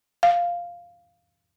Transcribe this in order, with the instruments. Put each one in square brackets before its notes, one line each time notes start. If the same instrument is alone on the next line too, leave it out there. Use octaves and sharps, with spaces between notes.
[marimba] F5